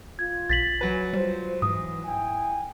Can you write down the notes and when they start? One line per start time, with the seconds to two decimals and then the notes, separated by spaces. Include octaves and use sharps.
0.19 F4 G#6
0.50 B1 A6 B6 F#7
0.81 F#3 B4 G#5
1.13 G3 F4 C5
1.62 G#2 E3 D#6
2.04 E4 G5 G#5